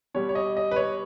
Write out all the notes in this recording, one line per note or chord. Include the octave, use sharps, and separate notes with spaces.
B2 G3 C#5
C#5
D#5
D#5
B4
C#5